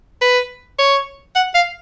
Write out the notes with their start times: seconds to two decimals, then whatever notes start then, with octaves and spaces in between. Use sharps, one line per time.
0.21 B4
0.79 C#5
1.35 F#5
1.54 F5